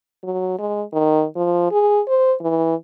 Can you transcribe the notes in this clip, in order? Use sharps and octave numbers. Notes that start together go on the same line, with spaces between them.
F#3
G#3
D#3
F3
G#4
C5
E3